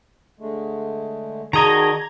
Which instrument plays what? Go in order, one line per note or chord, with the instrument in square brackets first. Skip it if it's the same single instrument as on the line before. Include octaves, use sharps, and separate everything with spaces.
[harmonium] D3 G#3 A3
[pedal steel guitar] D#3 D#5 [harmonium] F#4 D5 [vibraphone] G#4 A5 [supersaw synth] A#5 G#6